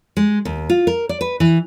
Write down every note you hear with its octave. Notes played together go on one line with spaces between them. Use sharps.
G#3
D#2
F4
A#4
D5
B4
E3